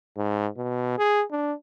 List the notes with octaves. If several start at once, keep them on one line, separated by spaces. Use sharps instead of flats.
G#2
B2
G#4
D4